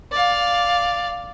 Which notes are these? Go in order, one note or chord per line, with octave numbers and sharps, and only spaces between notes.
D5 F5